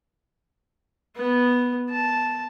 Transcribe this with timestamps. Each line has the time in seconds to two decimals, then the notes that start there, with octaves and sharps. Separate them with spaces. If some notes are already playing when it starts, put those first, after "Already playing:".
1.17 B3
1.91 A5